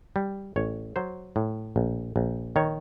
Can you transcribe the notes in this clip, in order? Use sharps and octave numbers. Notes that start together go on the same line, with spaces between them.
G3
A1 C#5
F#3 C5
A2
A#1
A#1
D#3 C#5